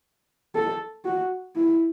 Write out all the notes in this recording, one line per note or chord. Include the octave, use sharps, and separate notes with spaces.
A4
F#4
E4